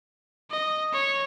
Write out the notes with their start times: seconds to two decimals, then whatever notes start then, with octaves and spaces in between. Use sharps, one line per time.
0.50 D#5
0.93 C#5